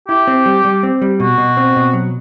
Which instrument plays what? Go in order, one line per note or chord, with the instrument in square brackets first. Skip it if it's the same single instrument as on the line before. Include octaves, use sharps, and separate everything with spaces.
[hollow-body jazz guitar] E4 [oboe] G4
[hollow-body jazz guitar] C4
G3
G3
C4
G3
[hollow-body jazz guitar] B2 [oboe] F#4
[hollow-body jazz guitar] B2
C4
B2
F#3